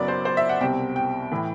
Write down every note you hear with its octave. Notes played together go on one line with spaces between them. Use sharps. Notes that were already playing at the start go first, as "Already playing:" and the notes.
Already playing: F#1 F#2 F#3 B3 D5
C5
C5
E5
F#5
C2 B2 G3 C4 G5
G5
A2 E3